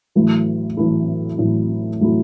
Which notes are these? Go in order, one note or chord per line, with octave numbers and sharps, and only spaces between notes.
A1 A2 F#3 A3 E4
A1 A2 F#3 A3 E4
A1 A2 F#3 A3 E4
A2 F#3 A3 E4